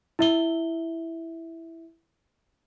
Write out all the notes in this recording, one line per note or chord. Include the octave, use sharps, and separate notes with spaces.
E4 E5 G7